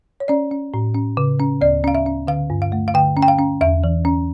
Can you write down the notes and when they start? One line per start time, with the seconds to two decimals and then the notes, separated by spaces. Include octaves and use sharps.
0.20 C#5
0.28 C#4 D5
0.51 C#4
0.74 A2
0.95 C#4
1.17 C#3
1.39 C#4
1.61 D2 D5
1.84 C#4 F5
1.95 E5
2.06 C#4
2.27 D3 F5
2.50 G2
2.62 F5
2.72 A3
2.88 F5
2.94 D3 G5
3.17 C#4
3.22 G5
3.28 F5
3.38 C#4
3.61 E2 E5
3.84 E3
4.05 C#4